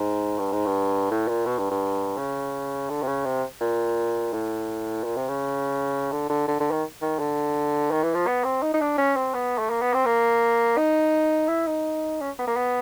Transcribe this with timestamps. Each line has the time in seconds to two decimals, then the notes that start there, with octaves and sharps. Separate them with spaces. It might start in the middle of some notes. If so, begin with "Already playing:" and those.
Already playing: G#2
0.38 G2
0.52 G#2
0.66 G2
1.11 A2
1.28 A#2
1.46 B2
1.58 G2
1.70 G2
2.17 C#3
2.90 D3
3.02 C3
3.07 C#3
3.25 C3
3.61 A#2
4.33 A2
5.04 A#2
5.16 C3
5.28 C#3
6.12 D3
6.30 D3
6.47 D3
6.60 D3
6.71 D#3
7.01 D#3
7.19 D3
7.91 D#3
8.03 E3
8.14 F3
8.27 B3
8.44 C4
8.62 D#4
8.74 D#4
8.81 D4
8.98 C#4
9.16 C4
9.34 B3
9.58 A3
9.70 A#3
9.82 B3
9.94 C4
10.05 A#3
10.77 D#4
11.48 E4
11.67 D#4
12.21 C#4
12.39 B3
12.47 A#3
12.56 B3